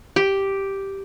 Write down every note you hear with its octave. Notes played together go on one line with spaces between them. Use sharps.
G4